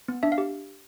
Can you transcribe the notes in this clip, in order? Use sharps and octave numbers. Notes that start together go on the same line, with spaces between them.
B3
D4 E5
F5
G4